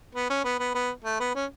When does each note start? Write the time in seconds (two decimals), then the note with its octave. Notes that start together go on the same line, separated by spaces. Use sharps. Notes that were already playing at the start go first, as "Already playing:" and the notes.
0.15 B3
0.30 C#4
0.45 B3
0.59 B3
0.75 B3
1.04 A3
1.20 B3
1.35 C#4